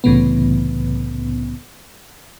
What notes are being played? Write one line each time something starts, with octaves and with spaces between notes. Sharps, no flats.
C2 A2 C#3 E3 B3